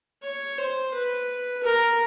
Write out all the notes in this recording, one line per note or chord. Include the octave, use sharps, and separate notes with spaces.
C#5
C5
B4
A#4